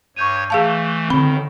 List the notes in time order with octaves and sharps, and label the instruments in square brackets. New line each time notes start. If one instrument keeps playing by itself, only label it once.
[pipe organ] G2 C#5 [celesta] C#6 G6 D#7
[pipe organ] E3 A3 [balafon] G#4 F5 A5
[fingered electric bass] D3 C4 [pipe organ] D#3 [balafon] B5